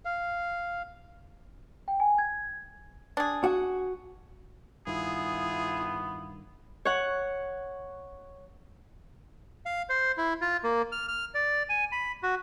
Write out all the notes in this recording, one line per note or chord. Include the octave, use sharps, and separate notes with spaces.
F5
G5
G#5
G#6
D4 G#4
F#4
G2 D#3 B3 E4 F4 G#4
C#5 F#5
F5
C5
E4
F4
A#3
F6
F6
D5
G#5
B5
F#4